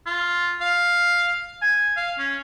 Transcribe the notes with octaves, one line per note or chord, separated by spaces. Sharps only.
F4
F5
G#5
F5
C#4